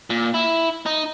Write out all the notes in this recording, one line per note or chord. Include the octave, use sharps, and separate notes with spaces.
A#2
E4
D#4